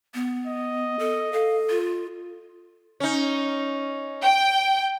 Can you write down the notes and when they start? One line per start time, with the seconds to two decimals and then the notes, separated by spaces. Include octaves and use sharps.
0.14 B3
0.47 D#5
0.99 A4
1.33 A4 F5
1.70 F4
3.00 C#4 D#4
4.23 G5